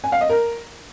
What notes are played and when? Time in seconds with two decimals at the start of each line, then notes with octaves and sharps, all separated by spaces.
0.04 G#5
0.12 F5
0.21 D#5
0.29 A#4